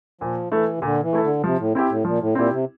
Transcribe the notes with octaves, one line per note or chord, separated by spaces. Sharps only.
A#2 F3
E3 A3 E4 A4
C3
A#2 D3
E3
A3 E4 A4
D3
C3 F3
A2
C4 E4 G4
A2
A#2 F3
A2
A#2 C4 E4 G4
C3